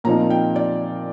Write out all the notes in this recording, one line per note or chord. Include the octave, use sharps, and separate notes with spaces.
A#2 F3 C4 D#4 A#5
G5
D5